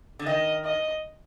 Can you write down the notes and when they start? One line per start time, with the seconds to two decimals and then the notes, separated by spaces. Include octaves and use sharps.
0.19 D3
0.26 D#3 D#5
0.64 D#5